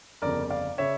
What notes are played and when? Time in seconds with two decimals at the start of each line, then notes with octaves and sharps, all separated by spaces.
0.22 G1 F2 C#3 A#4 D5
0.50 D5 F5
0.78 C#3 C#5 E5